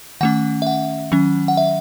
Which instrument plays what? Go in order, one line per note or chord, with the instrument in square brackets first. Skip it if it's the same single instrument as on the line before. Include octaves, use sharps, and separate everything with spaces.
[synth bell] D#3 A3 C#4 F#5
E5
F#5
D#3 F#3 C#4
F#5
E5